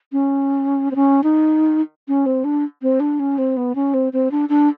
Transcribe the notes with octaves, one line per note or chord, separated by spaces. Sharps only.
C#4
C4
C#4
D#4
C#4
C4
D4
C4
D4
C#4
C4
B3
C#4
C4
C4
D4
D4